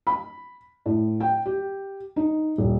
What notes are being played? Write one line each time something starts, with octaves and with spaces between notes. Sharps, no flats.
B5
A2
G5
G4
D#4
D#1